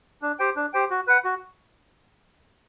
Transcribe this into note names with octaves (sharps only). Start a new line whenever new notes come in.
D4
G4 C5 G5
D4
G4 C5 G5
F#4
B4 F#5
F#4